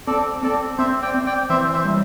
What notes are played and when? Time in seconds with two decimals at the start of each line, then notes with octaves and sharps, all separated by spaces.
0.07 C4 A4 D5
0.43 C4 A4 D5
0.78 C4 C5 E5
1.02 D5 G5
1.14 C4
1.26 D5 G5
1.50 E3 C5 E5
1.73 C5 E5
1.85 G3